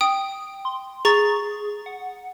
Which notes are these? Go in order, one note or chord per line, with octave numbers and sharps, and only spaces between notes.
G5 D#6
C6
G#4 A#5 C#6 A6
F#5